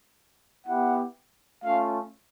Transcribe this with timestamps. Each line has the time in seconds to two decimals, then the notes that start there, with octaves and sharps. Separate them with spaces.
0.67 B3 E4 G4 F#5
1.64 A3 C#4 F4 F5